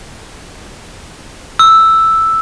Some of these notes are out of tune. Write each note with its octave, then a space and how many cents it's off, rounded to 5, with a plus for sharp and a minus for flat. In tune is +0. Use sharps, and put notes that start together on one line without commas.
E6 +0